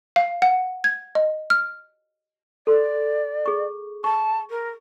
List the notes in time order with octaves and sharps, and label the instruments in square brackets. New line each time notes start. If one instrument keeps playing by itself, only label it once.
[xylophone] F5
F#5
G#6
D#5
F6
[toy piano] A4 C6 [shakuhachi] D5
[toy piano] G#4 C#6
[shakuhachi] A5 [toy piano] C#6
[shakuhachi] A#4